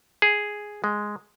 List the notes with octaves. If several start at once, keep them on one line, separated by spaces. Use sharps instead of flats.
G#4
G#3